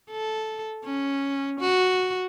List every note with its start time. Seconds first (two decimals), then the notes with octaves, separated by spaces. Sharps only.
0.11 A4
0.85 C#4
1.60 F#4